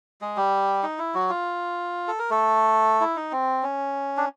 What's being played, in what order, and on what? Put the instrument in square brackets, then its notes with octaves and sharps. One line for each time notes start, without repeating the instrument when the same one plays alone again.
[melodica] G#3 G#4
G3 G4
D#4
E4
F#3 F#4
F4
A4
A#4
A3 A4
E4
D#4
C4
C#4
D4